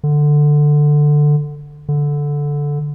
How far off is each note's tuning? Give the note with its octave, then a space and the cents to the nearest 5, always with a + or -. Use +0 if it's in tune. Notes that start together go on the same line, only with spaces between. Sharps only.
D3 +10
D3 -10